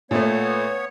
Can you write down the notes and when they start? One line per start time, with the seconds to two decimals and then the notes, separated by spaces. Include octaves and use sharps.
0.11 A#2 A3 B3 C#5